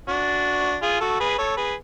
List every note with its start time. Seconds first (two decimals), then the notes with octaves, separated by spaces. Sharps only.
0.08 D4 F#4
0.82 F4 G#4
1.01 F#4 A4
1.20 G#4 B4
1.38 A4 C#5
1.57 G#4 B4